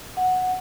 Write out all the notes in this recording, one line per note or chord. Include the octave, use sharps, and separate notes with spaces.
F#5